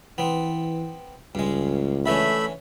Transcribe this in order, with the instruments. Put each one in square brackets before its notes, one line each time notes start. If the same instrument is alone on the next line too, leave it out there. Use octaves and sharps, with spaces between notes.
[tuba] E3 [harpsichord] B3 C4
[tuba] C#2 [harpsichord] G2 G#3
[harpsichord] D3 E3 C#4 [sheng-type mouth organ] A3 E5 B5